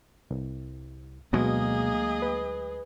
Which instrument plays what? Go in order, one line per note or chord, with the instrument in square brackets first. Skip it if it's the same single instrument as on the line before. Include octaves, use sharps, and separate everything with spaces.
[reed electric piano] C2
[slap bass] D2 F#3 G#3 [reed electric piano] B2 [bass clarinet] A#3 [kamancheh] G#4 D#5
[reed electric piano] B4